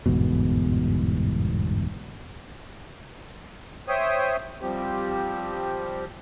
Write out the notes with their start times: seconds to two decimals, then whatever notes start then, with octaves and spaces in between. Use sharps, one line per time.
0.06 G1 E2 G#2 B2
3.88 C5 C#5 E5 G5 D#6
4.62 F3 G3 C4 G4